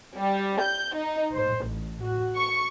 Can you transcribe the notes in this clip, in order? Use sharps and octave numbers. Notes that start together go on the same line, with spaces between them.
G3
G6
D#4
C5
A1
F#4
C#6